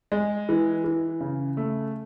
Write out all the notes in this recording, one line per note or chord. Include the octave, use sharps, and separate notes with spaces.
G#3
E3
E3
C#3
A3